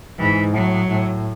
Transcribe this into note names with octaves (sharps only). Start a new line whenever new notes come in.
G#2 E3
A2 F#3
A2